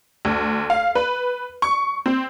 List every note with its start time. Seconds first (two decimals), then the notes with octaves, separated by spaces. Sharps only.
0.25 D2
0.70 F5
0.95 B4
1.62 C#6
2.06 C4